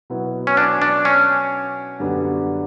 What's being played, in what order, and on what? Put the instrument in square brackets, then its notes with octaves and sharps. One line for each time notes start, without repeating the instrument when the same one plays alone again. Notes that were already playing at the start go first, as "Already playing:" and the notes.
[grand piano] B2 F#3 B3 E4
[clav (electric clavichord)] C#4
D4
D4
C#4
[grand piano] F#2 D3 G3 B3 D4